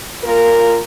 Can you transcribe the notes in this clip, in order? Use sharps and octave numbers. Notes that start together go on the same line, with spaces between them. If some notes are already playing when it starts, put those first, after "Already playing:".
A#2 F4 A#4